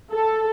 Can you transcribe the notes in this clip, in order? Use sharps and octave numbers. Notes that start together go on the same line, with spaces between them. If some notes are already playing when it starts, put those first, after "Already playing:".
A4